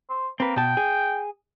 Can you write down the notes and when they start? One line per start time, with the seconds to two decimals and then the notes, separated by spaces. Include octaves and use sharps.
0.10 C5
0.40 A#3 C4 B4
0.56 B2 G5 A5
0.77 G#4